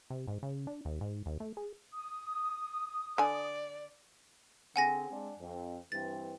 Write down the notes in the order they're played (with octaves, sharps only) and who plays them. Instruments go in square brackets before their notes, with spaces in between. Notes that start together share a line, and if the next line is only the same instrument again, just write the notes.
[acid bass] C3
G#2
C#3
D4
D#2
G#2
D#2
A3
G#4
[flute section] D#6
[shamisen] D3 G#5 [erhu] D5
[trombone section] D3 C4 G#4 [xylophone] F#5 G#5 A#6
[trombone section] G#3 C4 D4
F2
[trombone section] G2 E3 C4 [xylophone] A6